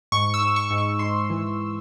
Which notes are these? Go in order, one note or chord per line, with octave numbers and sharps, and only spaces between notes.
G#2 C#6
E6
G#2
C#6
G#2
C#6
G#2 C6
E3